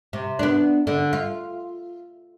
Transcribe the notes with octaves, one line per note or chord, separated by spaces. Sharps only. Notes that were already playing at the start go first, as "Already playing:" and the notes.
C3
B3 D4
D3
F4